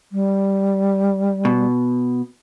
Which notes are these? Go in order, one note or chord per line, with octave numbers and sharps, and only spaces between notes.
G3
B2